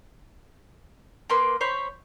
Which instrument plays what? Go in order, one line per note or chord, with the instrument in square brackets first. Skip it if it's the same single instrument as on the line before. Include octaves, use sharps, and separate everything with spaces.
[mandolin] A#3 B4 C6 D6
C5 C#5 B5